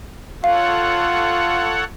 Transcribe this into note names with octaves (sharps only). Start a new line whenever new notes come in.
F4 A4 C#5 F5 F#5